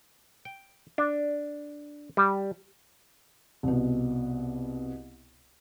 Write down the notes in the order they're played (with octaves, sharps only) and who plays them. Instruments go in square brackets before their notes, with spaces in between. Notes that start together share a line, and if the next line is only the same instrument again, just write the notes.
[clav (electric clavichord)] G5
D4
G3
[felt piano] C2 B2